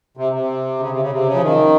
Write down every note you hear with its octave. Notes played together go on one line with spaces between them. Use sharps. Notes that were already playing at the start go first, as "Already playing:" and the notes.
C3
C3
C#3
C3
C#3
C3
C#3
F3
D#3